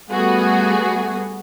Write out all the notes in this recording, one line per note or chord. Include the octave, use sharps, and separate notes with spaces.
G3 A3 B3 F#4 G#4